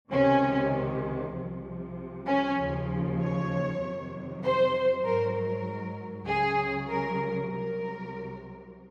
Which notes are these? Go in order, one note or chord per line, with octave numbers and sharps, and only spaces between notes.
C#2 C3 D#3 C#4
C2 C3 F3
C#4
D#2 C#3 F3
C#5
F2 C3 D#3 F#3
C5
G#2 F#3 A#4
A#4
C#2 C#3 F#3 G#4
A#4
C2 C3 F#3 A#4